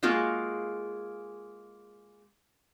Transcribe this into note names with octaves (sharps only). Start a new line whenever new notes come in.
G#3 A#3 F4 F#4 G#4